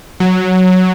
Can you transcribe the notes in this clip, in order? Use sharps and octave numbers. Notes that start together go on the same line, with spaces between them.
F#3